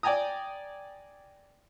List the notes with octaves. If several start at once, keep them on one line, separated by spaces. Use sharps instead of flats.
D5 G5 G#5 A#5 D#6